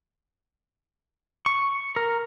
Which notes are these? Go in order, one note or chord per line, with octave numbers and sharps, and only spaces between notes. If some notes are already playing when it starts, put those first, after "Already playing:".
C#6
A#4